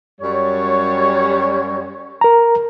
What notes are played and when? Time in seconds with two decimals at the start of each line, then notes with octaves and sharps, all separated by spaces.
0.21 F#2 G3 C#5
2.21 A#4 A#5